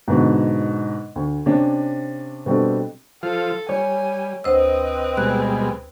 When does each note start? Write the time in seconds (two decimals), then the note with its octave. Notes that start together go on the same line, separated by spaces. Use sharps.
0.08 G#2 B2 D3
1.16 D2
1.46 C3 C#4 D4
2.46 B2 G3 C4 D4 A4
3.23 F3 F4 A4 C5
3.69 G3 C#5 G#5
4.44 D2 C4 B4 C5 D#5 E6
5.17 B2 G3 G#3 F#6